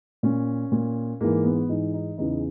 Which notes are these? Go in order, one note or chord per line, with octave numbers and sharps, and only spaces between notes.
A#2 C#4
A#2
G#2 E3 A#3
B3
G#2 E3 D#4
D#4
E2 C#3 E3 D#4